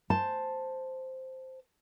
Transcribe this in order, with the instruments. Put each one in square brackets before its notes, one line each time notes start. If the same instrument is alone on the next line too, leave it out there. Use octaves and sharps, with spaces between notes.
[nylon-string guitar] C5 A5